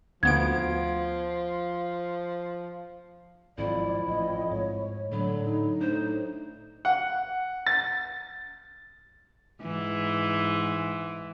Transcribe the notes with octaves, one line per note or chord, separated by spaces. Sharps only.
D2 F3 B3 G#6 D7
G#1 F2 G#2 F#3 E4 D5
A1 D#5
G#2 C#5
A2 D3 F#3 B5
D#4
A2 D4 C5
F#5
A6
G#2 E3